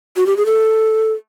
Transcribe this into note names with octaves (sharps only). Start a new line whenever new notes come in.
F#4
G4
G#4
A4